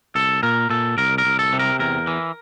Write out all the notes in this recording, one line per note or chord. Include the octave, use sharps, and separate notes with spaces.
C2 A4
A#2 A#4
A#2 A4
C2 A#4
A#4
C2
A4
C3
A#4
E2 A#4
E3